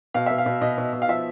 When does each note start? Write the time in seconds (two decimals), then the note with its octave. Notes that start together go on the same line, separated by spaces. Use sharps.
0.14 B2 F5
0.26 B2 E5
0.38 F5
0.46 B2
0.61 B2 D#5
0.78 B2
0.93 B2
1.02 F5
1.08 F3 E5